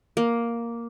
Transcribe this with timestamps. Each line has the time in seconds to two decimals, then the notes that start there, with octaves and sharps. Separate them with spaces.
0.17 A#3